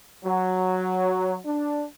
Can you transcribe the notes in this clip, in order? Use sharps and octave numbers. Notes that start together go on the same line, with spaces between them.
F#3
D4